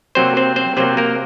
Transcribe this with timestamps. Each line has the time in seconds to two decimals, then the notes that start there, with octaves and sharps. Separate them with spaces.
0.15 C3 F#3 A#3 C4 C5
0.37 C4 C5
0.56 C4 C5
0.77 C3 F#3 A#3 C4 C5
0.97 A#3 A#4